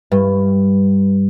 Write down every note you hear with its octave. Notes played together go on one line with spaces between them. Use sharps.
G2